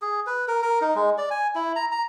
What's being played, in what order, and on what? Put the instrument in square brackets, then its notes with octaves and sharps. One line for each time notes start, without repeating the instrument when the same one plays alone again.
[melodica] G#4
B4
A#4
A#4
D#4
G#3
D5
G#5
E4
A#5
A#5